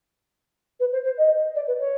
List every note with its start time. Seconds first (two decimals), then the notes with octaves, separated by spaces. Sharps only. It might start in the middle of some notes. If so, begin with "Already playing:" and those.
0.80 B4
0.92 C5
1.04 C5
1.17 D#5
1.55 D5
1.67 B4
1.79 C#5